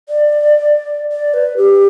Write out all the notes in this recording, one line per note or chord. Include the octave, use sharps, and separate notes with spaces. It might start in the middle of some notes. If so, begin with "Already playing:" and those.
D5
D5
B4
G4